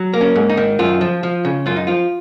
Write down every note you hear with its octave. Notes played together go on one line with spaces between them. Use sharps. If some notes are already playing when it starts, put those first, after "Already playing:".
Already playing: F#3
A#3
C#4
G#2
D#4
D#3
F#2 F4
F3
F3
C#3
F#2 F4
D#4
F3 F4